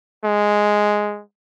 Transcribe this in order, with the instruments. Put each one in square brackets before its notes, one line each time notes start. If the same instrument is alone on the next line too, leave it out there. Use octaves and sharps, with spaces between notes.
[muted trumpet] G#3